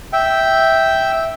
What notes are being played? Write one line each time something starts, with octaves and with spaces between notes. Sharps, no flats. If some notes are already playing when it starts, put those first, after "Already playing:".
E5 G5